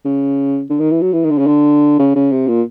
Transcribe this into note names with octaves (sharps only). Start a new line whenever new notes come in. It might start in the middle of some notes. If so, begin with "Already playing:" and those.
C#3
D3
D#3
E3
F#3
E3
D#3
D3
C#3
D3
C#3
C#3
C3
A#2